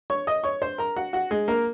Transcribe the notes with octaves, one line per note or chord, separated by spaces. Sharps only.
C#5 C#6
D#5 D#6
C#5 C#6
C5 C6
A#4 A#5
F#4 F#5
F#4 F#5
G#3 G#4
A#3 A#4